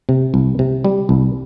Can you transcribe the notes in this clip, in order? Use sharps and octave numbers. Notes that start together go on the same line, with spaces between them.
C3
C2
C3
G3
C2